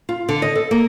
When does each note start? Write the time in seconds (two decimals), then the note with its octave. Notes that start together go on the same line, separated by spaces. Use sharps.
0.09 F4
0.29 D3
0.42 D#5
0.55 A4
0.71 A#3